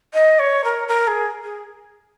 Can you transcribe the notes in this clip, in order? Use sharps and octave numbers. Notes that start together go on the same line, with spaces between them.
D#5
C#5
A#4
A#4
G#4
G#4